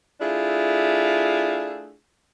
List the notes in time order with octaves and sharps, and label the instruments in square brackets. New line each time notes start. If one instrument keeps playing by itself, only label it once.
[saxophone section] A3 D4 E4 F4 G#4